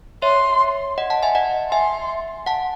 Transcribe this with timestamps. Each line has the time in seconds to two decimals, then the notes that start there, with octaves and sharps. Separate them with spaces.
0.22 C#5 E5 C6
0.98 D#5 F#5
1.10 F#5 A5
1.23 E5 G#5
1.35 D#5 F#5
1.72 E5 G#5 C6
2.46 F#5 A5